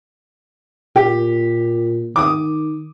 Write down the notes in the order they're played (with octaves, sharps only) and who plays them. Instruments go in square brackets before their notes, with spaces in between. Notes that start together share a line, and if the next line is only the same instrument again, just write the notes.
[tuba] A#2 [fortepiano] G4
[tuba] D#3 [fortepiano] D6 D#6